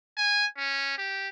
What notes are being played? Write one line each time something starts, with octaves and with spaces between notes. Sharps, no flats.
G#5
C#4
G4